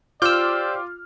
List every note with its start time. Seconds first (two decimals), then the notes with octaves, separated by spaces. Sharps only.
0.22 F4 G4 C5 D5 D6 E6 F6 G6